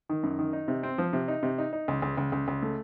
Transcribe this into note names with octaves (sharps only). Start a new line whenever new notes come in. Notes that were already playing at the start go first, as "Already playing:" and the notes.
D#3
F#2
D#3
D#4
C3
C4
F3
C3
D#4
C3
D#4
D#4
C#2
C#2
C#2
C#2
C#2
A3